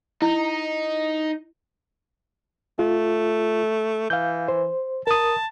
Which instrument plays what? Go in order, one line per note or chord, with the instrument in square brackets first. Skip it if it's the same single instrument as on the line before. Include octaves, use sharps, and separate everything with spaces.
[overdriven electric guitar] D#4 [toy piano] E4
[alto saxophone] A3 [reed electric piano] F4
[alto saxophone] E3 [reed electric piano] F5 G6
[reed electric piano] C5
[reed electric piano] A#4 D#6 [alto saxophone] A5